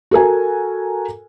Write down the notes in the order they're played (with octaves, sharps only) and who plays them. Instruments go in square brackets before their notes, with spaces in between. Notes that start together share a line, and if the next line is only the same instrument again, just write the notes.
[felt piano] F#4 A4 A#4 G#5